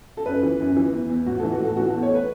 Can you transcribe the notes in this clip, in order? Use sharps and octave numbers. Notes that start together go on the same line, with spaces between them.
A4
F#2 B4
E3
F#2
E3
E2
E2
A2 F#4
E3 A4
F#4
A2 A4
E3 F#4
E2 A4
C#5
B4